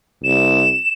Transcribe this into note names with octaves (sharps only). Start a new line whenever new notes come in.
C2 E7